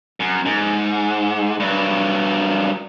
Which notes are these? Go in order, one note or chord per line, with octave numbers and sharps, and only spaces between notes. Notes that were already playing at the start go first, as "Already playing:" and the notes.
F#2
G#2
G2 F#3